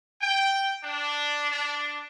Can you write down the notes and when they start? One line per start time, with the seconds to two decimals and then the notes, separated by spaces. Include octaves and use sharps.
0.21 G5
0.83 D4
1.50 D4